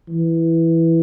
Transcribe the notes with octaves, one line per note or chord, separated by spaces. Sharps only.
E3